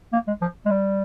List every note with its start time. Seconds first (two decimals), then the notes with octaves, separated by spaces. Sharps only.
0.13 A#3
0.27 G#3
0.42 F3
0.66 G#3
0.70 G3